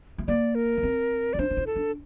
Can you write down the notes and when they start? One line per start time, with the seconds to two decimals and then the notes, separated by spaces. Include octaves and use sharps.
0.18 A3
0.28 A#3 D5
0.55 A#4
0.77 A#3
0.83 C4
1.33 E4 D5
1.39 D4 C5
1.51 D4
1.57 E4
1.67 A4
1.76 D4